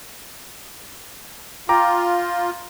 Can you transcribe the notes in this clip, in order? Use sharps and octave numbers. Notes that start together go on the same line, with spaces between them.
F4 G5 A#5 D6